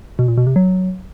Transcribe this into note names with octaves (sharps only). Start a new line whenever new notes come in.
B2
A#2
B2
C3
F#3